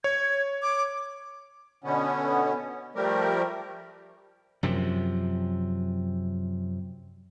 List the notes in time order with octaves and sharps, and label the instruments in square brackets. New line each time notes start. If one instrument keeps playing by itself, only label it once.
[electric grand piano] C#5 [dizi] G#6
[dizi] D6
[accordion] B2 D3 B3 C#4
F3 G3 A3 G4 A#4
[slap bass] F#2 C3 F3